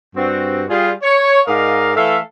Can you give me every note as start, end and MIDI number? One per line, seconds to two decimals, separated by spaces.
0.16 0.64 43
0.16 0.64 60
0.16 0.64 66
0.70 0.91 55
0.70 0.91 65
0.70 0.91 68
1.02 1.40 73
1.47 1.92 44
1.47 1.92 70
1.47 1.92 74
1.47 1.92 75
1.47 1.92 77
1.95 2.19 52
1.95 2.19 57
1.95 2.19 69
1.95 2.19 76
1.95 2.19 77